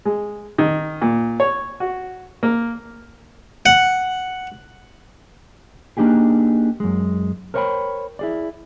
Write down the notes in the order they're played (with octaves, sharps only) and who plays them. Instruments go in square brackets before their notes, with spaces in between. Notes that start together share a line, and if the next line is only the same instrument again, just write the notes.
[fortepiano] G#3
D#3
A#2
C#5
F#4
A#3
[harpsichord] F#5
[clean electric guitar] A#3 D4 D#4 G4 G#4
F#2 G#3
A#4 C5 C#5 D#5 G5 B5
E4 G#4 D5